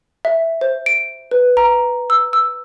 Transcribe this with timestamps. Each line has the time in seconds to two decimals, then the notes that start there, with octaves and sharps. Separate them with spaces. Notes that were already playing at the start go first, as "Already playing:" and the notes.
0.25 E5
0.61 C5
0.86 D7
1.31 B4
1.57 A#5
2.10 E6
2.33 E6